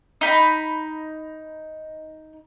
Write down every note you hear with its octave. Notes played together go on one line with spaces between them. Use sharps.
D#4 B5